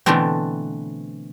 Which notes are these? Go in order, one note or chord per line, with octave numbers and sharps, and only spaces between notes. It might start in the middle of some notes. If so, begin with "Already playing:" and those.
B2 D3 E3 A3 B3 C4